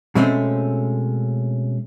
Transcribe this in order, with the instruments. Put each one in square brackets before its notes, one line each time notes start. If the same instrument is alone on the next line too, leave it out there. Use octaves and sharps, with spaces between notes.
[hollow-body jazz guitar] B2 G#3 A3 C4 C#4